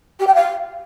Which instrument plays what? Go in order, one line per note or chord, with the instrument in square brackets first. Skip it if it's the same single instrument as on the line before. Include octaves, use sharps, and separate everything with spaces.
[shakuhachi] G4
G5
F5